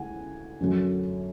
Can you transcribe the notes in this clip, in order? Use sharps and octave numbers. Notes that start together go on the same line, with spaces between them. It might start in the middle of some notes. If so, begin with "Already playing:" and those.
Already playing: D2 D3 G#3 E4 F#5 G#5
F#2 D3 F#3 A3 C#4